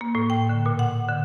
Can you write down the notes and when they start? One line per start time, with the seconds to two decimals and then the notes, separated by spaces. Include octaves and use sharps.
0.01 A#3
0.15 A2
0.30 G5
0.49 D3
0.66 A#2
0.79 F#5
1.09 D3